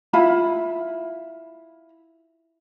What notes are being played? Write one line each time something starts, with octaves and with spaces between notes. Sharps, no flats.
E4 F4 B5